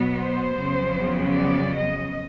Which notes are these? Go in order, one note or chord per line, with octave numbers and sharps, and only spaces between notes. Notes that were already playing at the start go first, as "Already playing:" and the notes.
Already playing: B2 F#3 B3
C5
F2 C#3 F#3 B3
D5
D#5